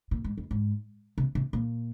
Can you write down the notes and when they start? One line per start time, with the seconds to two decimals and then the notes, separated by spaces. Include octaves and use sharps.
0.11 A#2
0.24 G#2
0.38 F2
0.51 G#2
1.18 C3
1.35 C3
1.53 A#2